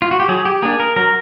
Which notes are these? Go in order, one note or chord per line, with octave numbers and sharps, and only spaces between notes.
F4
F#4
G4
F#3 G#4
G4
A#3 D4 G#4
A#4
F#3 A#4